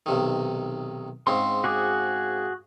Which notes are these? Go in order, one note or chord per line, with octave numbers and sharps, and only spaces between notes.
B1 C3 D#3
G#2 C#3 C4 C6
F#4 G#4 D6